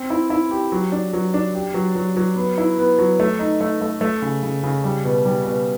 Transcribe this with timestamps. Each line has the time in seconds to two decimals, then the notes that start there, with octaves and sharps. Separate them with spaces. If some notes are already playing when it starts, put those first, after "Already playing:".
Already playing: C4
0.10 E4
0.30 E4
0.51 G4
0.72 F#3
0.92 D4
1.13 F#3
1.34 D4
1.55 G4
1.74 F#3
1.95 F#3
2.17 F#3
2.36 B3
2.58 E4
2.78 B3
2.99 F#3
3.20 A3
3.39 D#4
3.61 A3
3.81 A3
4.01 A3
4.22 C#3
4.43 C#3
4.63 C#3
4.84 G3
5.04 B2
5.25 G3
5.45 B2